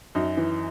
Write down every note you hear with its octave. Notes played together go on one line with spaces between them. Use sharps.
F#2 D#4
E3